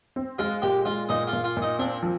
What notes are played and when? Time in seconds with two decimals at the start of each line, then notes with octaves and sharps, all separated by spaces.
0.16 C4
0.39 G#3 F4
0.62 A#2 G4
0.85 G#3 F4
1.09 A#2 D#4
1.27 F4
1.33 A#2
1.44 F4
1.57 A#2
1.62 D#4
1.79 C4 D4
2.03 F3